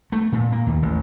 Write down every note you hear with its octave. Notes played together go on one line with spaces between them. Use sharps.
A3
A#2
A#3
D#2
A1